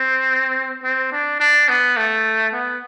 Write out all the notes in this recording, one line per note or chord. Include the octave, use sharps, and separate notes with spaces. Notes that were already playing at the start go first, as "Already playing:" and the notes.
Already playing: C4
C4
D4
D4
B3
A3
B3